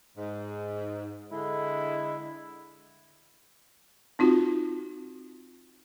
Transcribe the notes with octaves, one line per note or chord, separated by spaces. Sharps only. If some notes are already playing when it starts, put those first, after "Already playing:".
G#2
D3 G#3 E4
C4 D#4 F4 F#4